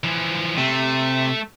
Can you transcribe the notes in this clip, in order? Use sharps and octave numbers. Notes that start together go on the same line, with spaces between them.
E3 F3
C3 A3